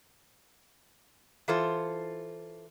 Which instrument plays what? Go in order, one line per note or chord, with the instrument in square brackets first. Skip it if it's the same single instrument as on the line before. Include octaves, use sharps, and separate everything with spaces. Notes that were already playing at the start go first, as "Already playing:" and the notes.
[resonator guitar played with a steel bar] E3 F4 A4 C5